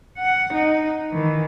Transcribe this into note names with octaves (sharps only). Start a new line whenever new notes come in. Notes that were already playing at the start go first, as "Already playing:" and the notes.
F#5
D#4
D#3 E3